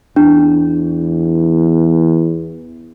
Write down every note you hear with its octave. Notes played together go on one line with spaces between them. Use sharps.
E2 D4